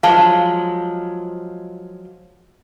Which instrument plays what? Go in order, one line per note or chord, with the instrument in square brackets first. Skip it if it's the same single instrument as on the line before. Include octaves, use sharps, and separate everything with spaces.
[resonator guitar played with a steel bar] F3 F#3 G#3 [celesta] F5 A5